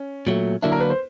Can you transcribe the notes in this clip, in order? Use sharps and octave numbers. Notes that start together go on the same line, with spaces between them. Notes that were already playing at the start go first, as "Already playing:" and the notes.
Already playing: C#4
A#2 F#3 A3
D3 F#3 A#3 D4 E4
A#4
B4
C5